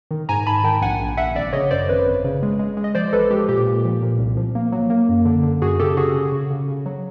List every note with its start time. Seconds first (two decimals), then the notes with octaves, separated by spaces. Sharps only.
0.11 D#3
0.29 G#2 G#5 A#5
0.47 G#2 A5 B5
0.64 D#3 G5 A5
0.82 A#1 F#5 G#5
1.00 A#1
1.17 A#1 E5 F#5
1.35 G#1 D5 E5
1.53 C#3 C#5 D#5
1.71 F#2 C5 D5
1.88 G#1 B4 C#5
2.06 G#1
2.24 C#3
2.43 G#3
2.59 G#3
2.77 G#3
2.84 D#5
2.95 F3 C5 D5
3.12 A1 A4 B4
3.30 G#3 G4
3.49 A#2 G4
3.67 A#2
3.85 F3
4.02 A#2
4.19 C2
4.37 F3
4.55 A#3
4.72 F#3
4.90 A#3
5.09 F#2
5.25 D3
5.43 D3
5.62 F#2 F#4 G#4
5.80 C#3 G4 A4
5.97 C#3 F#4 G#4
6.14 C#3
6.32 C#3
6.50 C#3
6.68 C#3
6.86 F#3